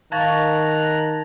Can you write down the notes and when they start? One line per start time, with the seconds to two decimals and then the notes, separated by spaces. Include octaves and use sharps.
0.12 D#3 F5 A5 A#5 C#6 F#6 G#6 A6